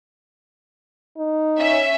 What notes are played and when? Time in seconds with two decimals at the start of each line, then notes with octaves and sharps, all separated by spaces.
1.17 D#4
1.58 C#4 E5